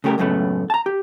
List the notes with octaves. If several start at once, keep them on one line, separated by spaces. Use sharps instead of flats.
C#3 A3 G4 G#4 A#4
C#2 F#2 A2 C#3 A3 B3
A5 A#5
G4